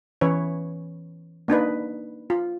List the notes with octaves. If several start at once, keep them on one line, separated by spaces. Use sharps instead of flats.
E3 C#4 B4 C#5
A#3 D4 D#4 B4
F4